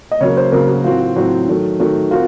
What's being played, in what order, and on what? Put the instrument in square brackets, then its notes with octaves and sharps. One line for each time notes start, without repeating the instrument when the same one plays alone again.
[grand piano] D#5
[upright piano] C#3 F#3 A#3 [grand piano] C#5
[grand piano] C5
[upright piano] C#3 F#3 A#3 [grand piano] A#4
[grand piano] F#4
[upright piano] A2 F#3 C4 F#4 [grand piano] F4
[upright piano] A2 F#3 C4 F#4
D#3 F#3 A3
D#3 F#3 A3
[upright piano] C4 F#4 A#4 [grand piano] F4